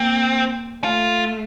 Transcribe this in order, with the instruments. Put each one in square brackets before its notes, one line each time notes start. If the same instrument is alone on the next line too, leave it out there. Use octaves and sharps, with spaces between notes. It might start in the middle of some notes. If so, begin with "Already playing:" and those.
Already playing: [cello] A#3 [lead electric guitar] C4
[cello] A3 [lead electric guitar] F4